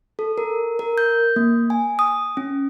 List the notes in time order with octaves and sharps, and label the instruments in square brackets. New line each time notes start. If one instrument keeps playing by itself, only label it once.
[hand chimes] A4
A#4
A#4
G6
A#3
G#5
D#6
C#4